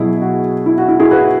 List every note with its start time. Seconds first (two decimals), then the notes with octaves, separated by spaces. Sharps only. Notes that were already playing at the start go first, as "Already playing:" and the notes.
Already playing: B2 F#3 B3 E4 G#4
0.22 F#4
0.66 E4
0.78 F#4
0.88 E4
0.99 E4 G#4
1.11 F#4 B4